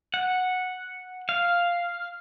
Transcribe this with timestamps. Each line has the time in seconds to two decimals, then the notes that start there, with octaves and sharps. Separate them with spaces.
0.14 F#5
1.29 F5